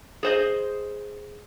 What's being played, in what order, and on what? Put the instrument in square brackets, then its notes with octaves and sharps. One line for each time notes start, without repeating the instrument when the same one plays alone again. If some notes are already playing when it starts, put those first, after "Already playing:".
[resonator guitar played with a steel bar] G#4 C5 D#5